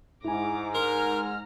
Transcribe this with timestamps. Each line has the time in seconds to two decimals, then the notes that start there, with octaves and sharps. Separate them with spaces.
0.24 G#2 E4 G#5 A#5 D6
0.75 A#4 A#5 C6 F6